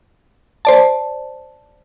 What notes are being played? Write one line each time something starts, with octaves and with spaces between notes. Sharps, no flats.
C5 D5 A5